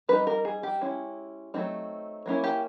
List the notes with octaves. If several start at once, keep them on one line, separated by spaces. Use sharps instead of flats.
G3 C4 D#4 B4
A#4
G#4
G4
G#3 C#4 E4
F#3 A3 C4 D#4
F#3 A#3 C#4 E4
G4